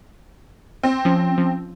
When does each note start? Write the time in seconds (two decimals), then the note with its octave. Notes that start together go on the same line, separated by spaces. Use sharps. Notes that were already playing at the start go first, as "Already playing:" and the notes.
0.83 C4
1.05 F3 C#4
1.38 F3